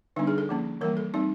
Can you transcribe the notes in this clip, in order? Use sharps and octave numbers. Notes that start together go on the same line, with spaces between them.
D3 G3 B3 D4 D#4
G#4
A4
F3 A#3 C#4
E3 G3 A#3 A#4
A4
G3 C4 D#4